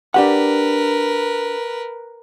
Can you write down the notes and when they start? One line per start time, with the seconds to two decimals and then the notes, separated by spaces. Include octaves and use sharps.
0.14 D4 G4 A#4 B4 F#5